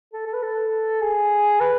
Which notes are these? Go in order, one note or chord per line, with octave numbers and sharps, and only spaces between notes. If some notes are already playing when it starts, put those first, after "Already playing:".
A4
A4
B4
A4
G#4
B4